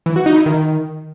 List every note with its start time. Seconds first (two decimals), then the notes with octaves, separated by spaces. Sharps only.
0.06 E3
0.16 F#4
0.26 D#4
0.36 E4
0.46 D#3